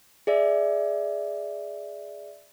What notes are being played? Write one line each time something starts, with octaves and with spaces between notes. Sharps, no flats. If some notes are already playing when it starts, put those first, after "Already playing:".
G#4 D5 E5